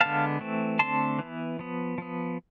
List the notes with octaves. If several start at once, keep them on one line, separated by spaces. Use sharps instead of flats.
D3 G#3 B3 F5 A5
E3 A3 C4
D3 A3 C4 A5 C6
E3 B3
F3 B3
F3 B3